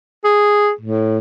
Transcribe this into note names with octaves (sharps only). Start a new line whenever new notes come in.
G#4
A2